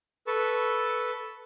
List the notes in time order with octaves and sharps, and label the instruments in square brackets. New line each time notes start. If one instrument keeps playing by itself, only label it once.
[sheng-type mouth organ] A4 B4 A5 C#6